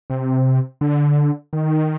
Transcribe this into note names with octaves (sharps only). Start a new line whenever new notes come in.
C3
D3
D#3